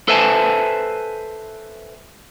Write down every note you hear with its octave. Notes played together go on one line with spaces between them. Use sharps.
A4 B4 C5 E5 G#5 A5